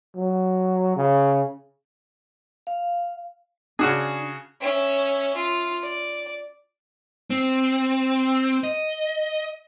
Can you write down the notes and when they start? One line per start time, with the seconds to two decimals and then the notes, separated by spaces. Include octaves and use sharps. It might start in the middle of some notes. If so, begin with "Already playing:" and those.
0.17 F#3
0.96 C#3
2.67 F5
3.79 C#3 D4 F#4 G#4
4.61 C#4 E5
5.36 F4
5.83 D5
7.30 C4
8.64 D#5